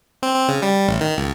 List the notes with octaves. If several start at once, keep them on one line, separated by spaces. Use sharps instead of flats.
C4
C4
C#3
G3
A1
D#3
C#2